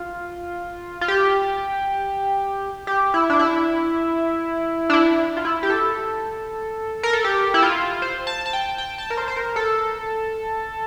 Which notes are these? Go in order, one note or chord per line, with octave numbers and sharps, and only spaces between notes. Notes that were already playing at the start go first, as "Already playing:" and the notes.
Already playing: F4
F4
G4
G4
E4
D4
E4
D4
E4
F4
E4
G4
A4
A#4
A4
G4
E4
F4
C5
A5
A5
G5
G5
A5
A#4
C5
C5
A#4
A4